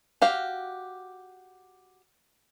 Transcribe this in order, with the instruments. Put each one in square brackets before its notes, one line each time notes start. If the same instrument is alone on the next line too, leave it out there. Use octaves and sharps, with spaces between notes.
[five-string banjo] F#4 G4 F5